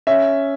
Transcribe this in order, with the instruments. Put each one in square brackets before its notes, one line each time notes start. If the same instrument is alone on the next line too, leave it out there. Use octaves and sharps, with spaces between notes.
[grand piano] C#4 E5